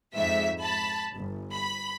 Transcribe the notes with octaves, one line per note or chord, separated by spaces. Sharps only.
F2 G#2 E5 B6
A5 B5
G1
B5